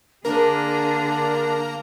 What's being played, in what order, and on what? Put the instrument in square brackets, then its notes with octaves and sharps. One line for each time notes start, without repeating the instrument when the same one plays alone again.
[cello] D3 G#4 [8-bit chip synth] A#3 A#5 [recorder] D4 [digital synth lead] A#4